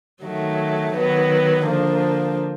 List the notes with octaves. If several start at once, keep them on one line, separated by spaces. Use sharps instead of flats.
D#3 F#3 A3
D#3 F#3 B3
D3 F3 A#3 D4